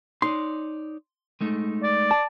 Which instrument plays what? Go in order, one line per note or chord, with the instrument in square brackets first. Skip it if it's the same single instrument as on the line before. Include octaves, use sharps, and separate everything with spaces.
[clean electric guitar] D#4 C#5 D5 [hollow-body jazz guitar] C6
[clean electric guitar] G#3 A3 D#4
[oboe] D5
[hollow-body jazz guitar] A5